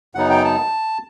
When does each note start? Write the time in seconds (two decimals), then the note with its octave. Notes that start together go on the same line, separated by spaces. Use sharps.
0.15 F#2 C#3 F#3 B3 D#4 F#5
0.30 G5
0.44 A5